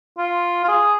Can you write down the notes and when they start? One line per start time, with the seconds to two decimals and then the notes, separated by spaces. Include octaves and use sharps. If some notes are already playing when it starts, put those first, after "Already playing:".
0.18 F4
0.64 F4
0.68 G#4